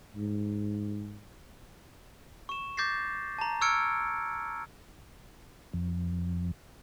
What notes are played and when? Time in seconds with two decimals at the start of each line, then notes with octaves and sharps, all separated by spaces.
0.16 G#2
2.49 C#6 E7
2.77 D6 G6 A6 A#6 C7
3.39 A5 A#5
3.61 C#6 E6 F6 G#6 C#7 D7
5.73 F2